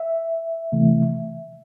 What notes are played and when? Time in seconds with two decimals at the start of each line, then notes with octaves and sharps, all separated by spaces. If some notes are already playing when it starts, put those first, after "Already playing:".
Already playing: E5
0.72 C3 E3 A3